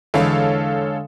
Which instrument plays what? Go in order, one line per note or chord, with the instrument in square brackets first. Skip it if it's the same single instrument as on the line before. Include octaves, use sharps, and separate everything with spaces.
[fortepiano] E2 [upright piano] D3 G#3 [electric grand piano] A4 C#5 F5